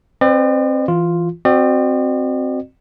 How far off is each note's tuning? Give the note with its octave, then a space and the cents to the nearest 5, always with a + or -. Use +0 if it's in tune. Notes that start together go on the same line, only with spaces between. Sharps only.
C4 +20 B4 +45 D5 +45
E3 +15 F4 +0
C4 +0 F#4 +0 D5 +45